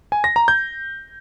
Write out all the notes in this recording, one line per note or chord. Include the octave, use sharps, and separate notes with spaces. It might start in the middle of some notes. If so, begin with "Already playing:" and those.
G#5
A#6
A#5
G6